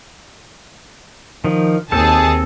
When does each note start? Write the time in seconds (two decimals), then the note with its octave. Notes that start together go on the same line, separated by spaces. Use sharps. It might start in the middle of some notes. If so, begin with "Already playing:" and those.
1.44 D#3 F3
1.92 D#2 C4 G#4 A4 A5